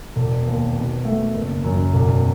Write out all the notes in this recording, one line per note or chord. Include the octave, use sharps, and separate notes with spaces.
E1
D#2
B2
A3
F#1
F#2
E1